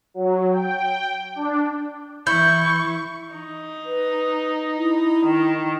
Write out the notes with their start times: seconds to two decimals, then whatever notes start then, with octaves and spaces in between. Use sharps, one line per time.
0.14 F#3
0.51 G5
1.35 D4
2.27 E3 E4 C#6 G6
3.35 D#4
3.86 B4
4.77 E4
5.26 D#3